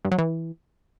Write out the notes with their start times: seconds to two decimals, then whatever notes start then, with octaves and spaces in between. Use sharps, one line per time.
0.05 G2
0.11 F#3
0.18 E3